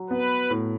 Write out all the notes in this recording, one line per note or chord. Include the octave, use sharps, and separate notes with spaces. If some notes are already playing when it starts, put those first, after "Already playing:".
Already playing: F#3
B3 B4
A2